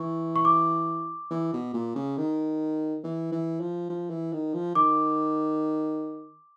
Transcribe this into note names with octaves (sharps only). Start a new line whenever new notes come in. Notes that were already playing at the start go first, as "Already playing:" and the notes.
Already playing: E3 C#6
C#6
D6
E3
B2
A#2
C#3
D#3
E3
E3
F3
F3
E3
D#3
F3
D#3 D6